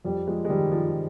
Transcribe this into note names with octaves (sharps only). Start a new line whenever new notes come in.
F2 G3
F3 G#3
G#3
D#3 G3
F3